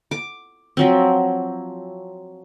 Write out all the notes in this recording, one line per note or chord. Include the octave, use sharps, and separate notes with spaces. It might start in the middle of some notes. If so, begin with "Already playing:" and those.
D6
F3 F#3 C4